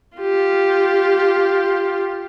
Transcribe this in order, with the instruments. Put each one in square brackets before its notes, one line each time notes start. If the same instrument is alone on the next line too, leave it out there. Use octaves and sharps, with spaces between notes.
[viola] F4 G4